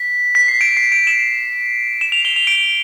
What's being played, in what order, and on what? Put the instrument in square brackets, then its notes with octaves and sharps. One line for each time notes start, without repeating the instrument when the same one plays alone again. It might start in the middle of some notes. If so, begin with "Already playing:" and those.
Already playing: [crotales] B6
B6
C7
D7
C7
D7
E7
E7
F7
G7
F7
D7